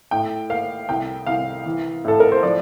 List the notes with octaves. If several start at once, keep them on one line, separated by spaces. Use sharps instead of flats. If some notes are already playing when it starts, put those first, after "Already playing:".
A2 G5
A#3 F5
C2 G5
C2 F5
E3
A2 A4
A#4
C5
F3 D5